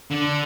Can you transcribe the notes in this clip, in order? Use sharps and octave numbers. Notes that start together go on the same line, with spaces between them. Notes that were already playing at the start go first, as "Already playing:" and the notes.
D3